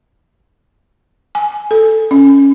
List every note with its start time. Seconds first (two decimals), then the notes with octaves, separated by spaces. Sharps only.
1.35 G#5
1.71 A4
2.11 C#4